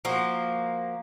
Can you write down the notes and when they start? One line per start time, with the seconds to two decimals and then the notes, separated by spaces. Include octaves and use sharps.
0.05 F3 A#3 F#4